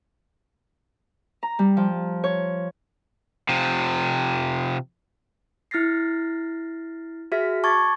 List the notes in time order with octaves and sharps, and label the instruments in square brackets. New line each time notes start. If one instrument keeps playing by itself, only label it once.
[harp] A#5
G3
F3
C#5
[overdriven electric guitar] C3 F3
[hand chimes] E4 F6 A6 A#6 C7
F#4 G#4 E5 F6 B6
A5 C#6 D6 G#6 A6